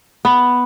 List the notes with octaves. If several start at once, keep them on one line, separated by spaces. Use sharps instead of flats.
B3